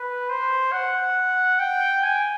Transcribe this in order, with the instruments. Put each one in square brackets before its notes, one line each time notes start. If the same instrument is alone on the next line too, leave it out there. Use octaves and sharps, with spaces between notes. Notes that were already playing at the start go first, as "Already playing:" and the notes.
Already playing: [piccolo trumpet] B4
C5
F#5
G5
G#5